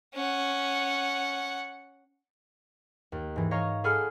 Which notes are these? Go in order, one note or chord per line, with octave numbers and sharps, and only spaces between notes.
C#4 F#5
D#2
G#2 E3
C#5 D#5 F5 A#5 C#6
G#4 A4 F#5 G#5 B5 F6